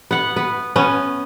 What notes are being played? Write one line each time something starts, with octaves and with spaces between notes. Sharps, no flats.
B3 F#5
B3
B3 C#4